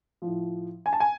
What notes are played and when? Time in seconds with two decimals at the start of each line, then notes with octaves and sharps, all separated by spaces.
0.22 A2 F3
0.86 G#5
0.93 A5
1.00 G#5